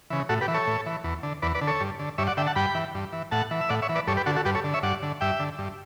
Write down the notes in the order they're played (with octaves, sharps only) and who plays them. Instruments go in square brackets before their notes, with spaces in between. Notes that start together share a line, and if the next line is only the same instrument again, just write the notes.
[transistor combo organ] C#3 E3
A2 F#4 A4
G4 B4
E3
A4 C#5
A2
E3
E2
D3
E2 B4 D5
B4 D5
D3
A4 C#5
G2
D3
G2 C#5 E5
D5 F#5
D3 E5 G5
F#5 A5
G2 G5 B5
E3
G2
E3
A2 F#5 A5
E3
E5
A2 D5 F#5
C#5 E5
E3
B4 D5
G2 A4 C#5
G4 B4
D3 F#4 A4
F#4 A4
G2 G4 B4
A4 C#5
D3
C#5 E5
G2 D5 F#5
D3
G2 E5 G5
D3
G2